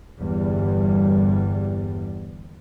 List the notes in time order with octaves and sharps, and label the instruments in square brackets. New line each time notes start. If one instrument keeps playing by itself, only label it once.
[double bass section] G1 E2 G3